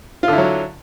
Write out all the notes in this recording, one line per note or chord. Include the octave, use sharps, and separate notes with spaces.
D3 F#3 E4 F4